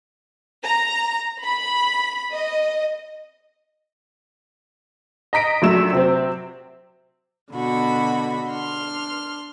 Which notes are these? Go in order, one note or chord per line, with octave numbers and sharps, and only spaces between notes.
A#5
B5
D#5
D#5 A#5 B6 D7
A#1 F#2 F#3 A3 E6 E7
C3 F#3 C4
B2 D3 F#4 B5
D4 C6 F6